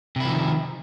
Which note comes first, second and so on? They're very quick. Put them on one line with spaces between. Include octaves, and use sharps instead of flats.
C3 E4 F3 D#3